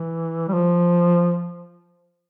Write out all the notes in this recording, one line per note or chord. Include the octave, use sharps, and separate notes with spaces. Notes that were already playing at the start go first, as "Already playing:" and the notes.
Already playing: E3
G3
F3